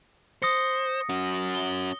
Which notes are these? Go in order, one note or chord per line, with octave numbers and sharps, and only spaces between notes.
C5 D#6 A#6 C#7
C#4 F#4
G7